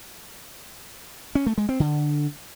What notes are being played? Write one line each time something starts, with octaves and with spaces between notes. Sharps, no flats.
C#4
A3
G#3
C4
D3